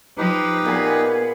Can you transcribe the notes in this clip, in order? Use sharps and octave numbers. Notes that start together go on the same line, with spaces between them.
F3 D#4 G4 B4
A#2 B3 G#4